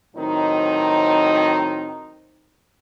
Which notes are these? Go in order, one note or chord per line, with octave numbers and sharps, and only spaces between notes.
A2 D#3 F#3 C4 D#4